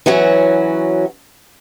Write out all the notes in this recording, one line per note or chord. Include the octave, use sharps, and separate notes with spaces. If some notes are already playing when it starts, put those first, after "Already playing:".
E3 F#3 C#4 F#4